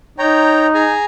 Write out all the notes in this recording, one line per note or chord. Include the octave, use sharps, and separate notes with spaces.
D#4 C#5 G5 A#5
G#4 G#5 A#5